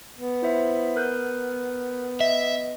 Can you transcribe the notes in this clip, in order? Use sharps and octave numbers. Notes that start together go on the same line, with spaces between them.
B3
E4 C5 E5
A#4 F#6 G6
D#5 E5